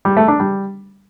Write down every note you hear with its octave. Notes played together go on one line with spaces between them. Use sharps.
G3
A3
D4
G3